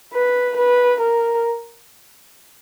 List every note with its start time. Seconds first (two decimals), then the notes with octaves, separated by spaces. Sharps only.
0.14 B4
0.57 B4
1.00 A#4